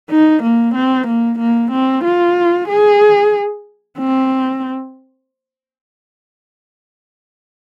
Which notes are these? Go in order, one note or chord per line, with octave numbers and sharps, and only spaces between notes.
D#4
A#3
C4
A#3
A#3
C4
F4
G#4
C4